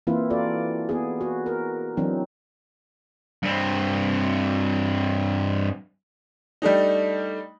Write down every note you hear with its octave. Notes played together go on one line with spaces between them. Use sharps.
E3 A#3 C4 E4 F4 B4
F4 F#4 A4 D5
B3 G#4
F#4
A#4
E3 F#3 C4 D4 D#4
G2 C4
G3 A3 D4 D#4